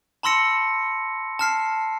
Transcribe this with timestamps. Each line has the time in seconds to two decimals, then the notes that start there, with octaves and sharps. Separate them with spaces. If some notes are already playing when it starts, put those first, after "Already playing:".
0.23 A5 B5 C6 E6 A#6 C#7
1.39 A5 F6 C7